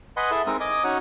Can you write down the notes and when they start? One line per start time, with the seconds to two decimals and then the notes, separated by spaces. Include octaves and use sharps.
0.17 B4 D#5 F#5 G#5 B5 C6
0.31 E4 G#4 A4 E5 A5
0.47 G#3 C4 D#4 A#4 D#6
0.60 D#5 G#5 D6 D#6
0.84 C#4 D#4 F#4 C#5 F#5 G#5